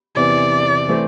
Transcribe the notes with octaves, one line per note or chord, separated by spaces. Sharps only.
E2 C3 E3 D5
E3 A3 C4